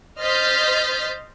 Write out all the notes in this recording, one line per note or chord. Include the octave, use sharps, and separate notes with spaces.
C5 D#5 F6 G6 A6 B6